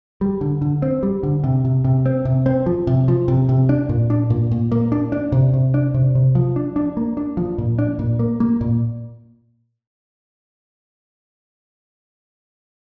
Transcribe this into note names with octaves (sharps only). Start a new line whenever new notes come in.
G3
D3
D3
C4
G3
D3
C3
C3
C3
C4
C3
C4
F3
C3
F3
C3
C3
D4
A#2
D4
A#2
A#2
A#3
D4
D4
C3
C3
D4
C3
C3
F3
D4
D4
A#3
D4
F3
A#2
D4
A#2
A#3
A#3
A#2